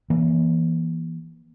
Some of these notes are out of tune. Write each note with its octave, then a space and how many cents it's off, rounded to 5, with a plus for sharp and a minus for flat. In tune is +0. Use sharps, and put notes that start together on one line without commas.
E3 +5 A#3 +35